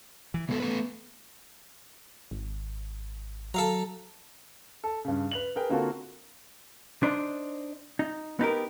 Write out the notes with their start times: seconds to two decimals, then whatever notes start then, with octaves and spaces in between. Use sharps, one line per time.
0.34 E3
0.49 C#3 G#3 B3 A4
0.60 A3 A4 B4
2.31 G#1
3.54 F#3 A4 F5 A#5
4.84 A4
5.05 G2 C#3
5.31 B4 F7 F#7
5.56 G#4 A#4 B4 G5
5.69 D3 A#3 C4 F4 F#4 A4
7.03 D4 D#4 C5
7.99 D#4
8.39 B3 D#4 G4 A#4